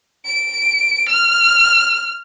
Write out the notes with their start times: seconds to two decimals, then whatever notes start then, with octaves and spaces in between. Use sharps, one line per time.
0.25 D7
1.09 F6